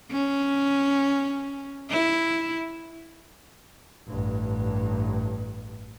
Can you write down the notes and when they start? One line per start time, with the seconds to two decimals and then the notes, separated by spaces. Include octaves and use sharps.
0.11 C#4
1.90 E4
4.08 A1 G2